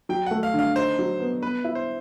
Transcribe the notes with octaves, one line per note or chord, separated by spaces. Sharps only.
F#3 G5
A3 F#5
F5
D3
F5
D#4 C5
F#3
B3
B3 B4
E4
C5